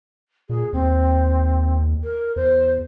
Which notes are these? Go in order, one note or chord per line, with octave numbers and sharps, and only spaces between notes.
A#2 G#4
D#2 C4
A#4
E2 C5